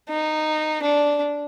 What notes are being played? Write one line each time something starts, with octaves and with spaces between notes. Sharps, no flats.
D#4
D4